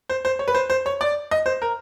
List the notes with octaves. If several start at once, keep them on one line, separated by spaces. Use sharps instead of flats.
C5
C5
C#5
B4
C5
C5
C#5
D5
D#5
C5
A#4